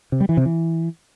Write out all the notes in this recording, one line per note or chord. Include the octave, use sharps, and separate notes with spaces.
C3
G3
E3
C3
E3